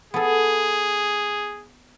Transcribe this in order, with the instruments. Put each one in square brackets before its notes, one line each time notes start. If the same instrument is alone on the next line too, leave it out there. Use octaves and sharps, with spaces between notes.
[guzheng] B3 A4 [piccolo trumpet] G#4